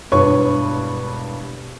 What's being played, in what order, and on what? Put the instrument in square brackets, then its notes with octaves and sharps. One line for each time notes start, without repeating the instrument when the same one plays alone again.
[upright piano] E1 G2 D4 B4 C#5 C#6